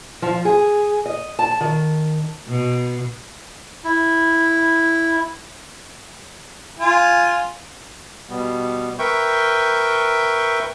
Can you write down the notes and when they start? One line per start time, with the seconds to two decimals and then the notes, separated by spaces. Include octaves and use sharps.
0.22 F3
0.45 G#4
1.06 D#5
1.39 A5
1.61 D#3
2.47 B2
3.84 E4
6.79 F4 G#5
8.30 B2 G3 B3
8.99 A#4 B4 E5 G5 C#6 G6